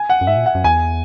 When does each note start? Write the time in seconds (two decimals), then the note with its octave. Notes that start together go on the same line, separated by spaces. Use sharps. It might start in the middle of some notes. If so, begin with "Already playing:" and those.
Already playing: G#5
0.10 F#5
0.21 F#2
0.27 G#2 E5
0.36 A#2
0.46 F#5
0.55 F#2
0.64 E2 G#5